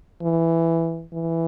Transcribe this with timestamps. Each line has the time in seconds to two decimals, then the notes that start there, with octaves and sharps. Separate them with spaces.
0.22 E3
1.14 E3